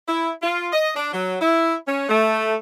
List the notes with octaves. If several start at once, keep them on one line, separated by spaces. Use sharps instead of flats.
E4
F4
D#5
D4
F#3
E4
C#4
A3